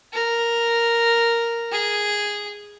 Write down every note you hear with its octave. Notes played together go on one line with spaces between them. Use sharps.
A#4
G#4